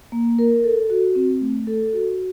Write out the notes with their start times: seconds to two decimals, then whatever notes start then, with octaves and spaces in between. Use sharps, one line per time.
0.12 A#3
0.39 A#4
0.64 A4
0.90 F#4
1.15 C4
1.41 A3
1.67 A4
1.93 F#4